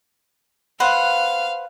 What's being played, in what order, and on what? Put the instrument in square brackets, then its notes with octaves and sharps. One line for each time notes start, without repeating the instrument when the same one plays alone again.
[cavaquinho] B4 C5 F#5 [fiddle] F5